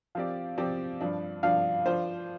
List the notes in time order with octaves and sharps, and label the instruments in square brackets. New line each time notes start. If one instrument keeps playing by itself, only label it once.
[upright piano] F3 C4 G4 D5 [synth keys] F5
[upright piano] F3 C4 G4 D5
G2 F3 D4
[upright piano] G2 F3 D4 [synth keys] F5
[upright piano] F3 D4 F4 C5